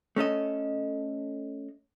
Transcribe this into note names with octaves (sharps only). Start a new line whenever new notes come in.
A3 C#4 A4 D#5